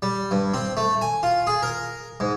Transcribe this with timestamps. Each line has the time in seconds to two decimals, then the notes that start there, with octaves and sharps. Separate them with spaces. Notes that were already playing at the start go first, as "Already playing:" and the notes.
0.02 G3
0.31 G2
0.54 C4
0.77 A3
1.02 G#5
1.23 F4
1.47 G#4
1.63 A#4
2.20 G#2